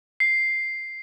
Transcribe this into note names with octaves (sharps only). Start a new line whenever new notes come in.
C7